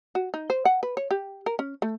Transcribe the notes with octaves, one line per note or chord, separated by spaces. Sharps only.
F#4
D#4
C5
F#5
B4
C#5
G4
A#4
C#4
A3